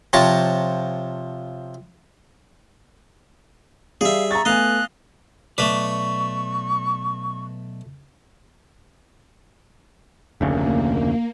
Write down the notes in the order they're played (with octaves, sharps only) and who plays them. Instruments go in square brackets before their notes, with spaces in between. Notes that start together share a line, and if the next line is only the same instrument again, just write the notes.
[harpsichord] C3 F3 C#5 A5 A#5
[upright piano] G3 [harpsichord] G#4 E5 [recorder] F5
[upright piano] A#5 A6 [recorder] C#6
[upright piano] A3 B3 G#5 [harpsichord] D#5 F5 [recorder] F#6
[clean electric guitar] B1 D5 [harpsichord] A3 B4 [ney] C#6
[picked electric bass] F1 D2 C#3 [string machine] A#3